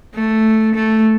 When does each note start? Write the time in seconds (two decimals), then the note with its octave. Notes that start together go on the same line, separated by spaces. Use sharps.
0.14 A3
0.75 A3